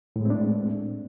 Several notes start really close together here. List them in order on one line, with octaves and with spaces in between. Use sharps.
A2 G#3 C4 D4 A3